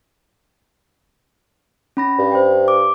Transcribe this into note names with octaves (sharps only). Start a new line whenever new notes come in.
C#4 B5 A#6
G2
C5 G5
D6